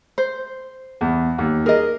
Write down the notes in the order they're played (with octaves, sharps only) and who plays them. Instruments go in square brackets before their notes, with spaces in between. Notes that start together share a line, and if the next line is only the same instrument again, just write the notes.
[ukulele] C5
[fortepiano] E2
D#2
[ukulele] G#4 D#5 [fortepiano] A#4